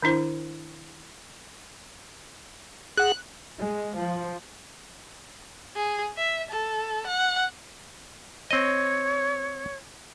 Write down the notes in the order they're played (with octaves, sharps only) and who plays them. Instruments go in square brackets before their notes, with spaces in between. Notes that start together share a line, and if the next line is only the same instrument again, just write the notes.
[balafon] D#3 D4 E4 C5
[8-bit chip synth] G#4 F#5 [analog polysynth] F#6
[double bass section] G#3
F3
[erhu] G#4
E5
A4
F#5
[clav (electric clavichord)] C4 D#5 [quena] C#5